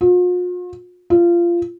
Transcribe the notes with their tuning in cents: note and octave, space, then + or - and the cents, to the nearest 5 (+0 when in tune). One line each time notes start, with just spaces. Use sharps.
F4 +45
F4 -20